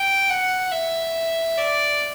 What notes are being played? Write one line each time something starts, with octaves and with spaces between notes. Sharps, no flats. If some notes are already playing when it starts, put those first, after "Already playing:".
Already playing: G5
F#5
E5
D5